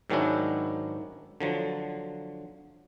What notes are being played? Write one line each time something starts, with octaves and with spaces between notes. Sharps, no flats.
G#2 D#3 F#3 C#4 D4 E4
D3 F3 F#3